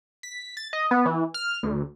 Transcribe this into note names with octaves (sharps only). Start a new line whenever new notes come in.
B6
A6
D#5
B3
E3
F6
D2